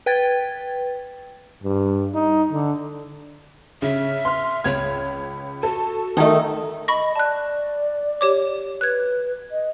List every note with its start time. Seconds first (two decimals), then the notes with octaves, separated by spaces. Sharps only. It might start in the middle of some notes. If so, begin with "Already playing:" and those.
0.06 B4 G5 G#6 A6
1.63 G2
2.14 D#4
2.52 D3
3.82 C#3 E5
4.25 C6 F6
4.64 C#2 C#5 G#6
5.63 F#4 A4
6.17 D#3 A3 D#4
6.88 D#5 B5 C#6 A#6
7.16 D5 A5 F#6
8.21 G4 C#5 D6
8.81 B4 F#6 G#6
9.51 D#5